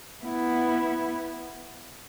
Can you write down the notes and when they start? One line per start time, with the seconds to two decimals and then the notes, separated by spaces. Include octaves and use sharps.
0.24 B3 E4